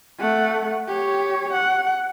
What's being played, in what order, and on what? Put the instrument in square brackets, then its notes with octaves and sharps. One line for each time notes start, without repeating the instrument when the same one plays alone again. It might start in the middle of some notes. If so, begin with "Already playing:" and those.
[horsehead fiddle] A3 F#5
G4 C#5
F#5